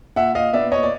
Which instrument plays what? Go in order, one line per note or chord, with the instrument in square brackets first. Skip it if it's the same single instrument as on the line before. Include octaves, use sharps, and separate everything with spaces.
[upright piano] A#2 E5 F#5
A#2 D#5 F5
B3 D5 E5
A#2 C#5 D#5
D5